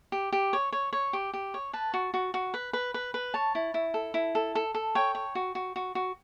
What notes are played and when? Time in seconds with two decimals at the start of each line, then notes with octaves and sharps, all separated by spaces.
0.12 G4
0.32 G4
0.53 C#5
0.72 C#5
0.93 C#5
1.13 G4
1.34 G4
1.54 C#5
1.73 B4 A5
1.94 F#4
2.14 F#4
2.34 F#4
2.54 B4
2.73 B4
2.94 B4
3.14 B4
3.34 C#5 A5
3.55 E4
3.74 E4
3.94 A4
4.14 E4
4.35 A4
4.55 A4
4.75 A4
4.95 C#5 G5
5.15 C#5
5.35 F#4
5.55 F#4
5.76 F#4
5.95 F#4